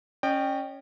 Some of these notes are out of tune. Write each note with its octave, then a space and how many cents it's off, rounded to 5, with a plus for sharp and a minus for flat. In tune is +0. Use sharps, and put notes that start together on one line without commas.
C#4 +0 D#5 -40 G5 +0